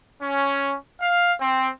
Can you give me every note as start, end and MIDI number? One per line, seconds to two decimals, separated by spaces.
0.21 0.75 61
1.00 1.32 77
1.39 1.68 60